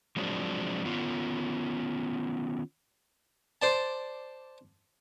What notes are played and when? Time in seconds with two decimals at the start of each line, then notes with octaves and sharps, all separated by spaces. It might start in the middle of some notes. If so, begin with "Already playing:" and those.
0.16 F3 F#3 G#3 C4 D4
0.85 D#3 B3 C#4 F4
3.62 C5 D5 A5